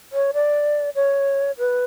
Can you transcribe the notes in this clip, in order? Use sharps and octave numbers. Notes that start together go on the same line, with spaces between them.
C#5
D5
C#5
B4